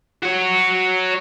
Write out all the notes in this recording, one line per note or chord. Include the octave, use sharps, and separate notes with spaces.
F#4 C#5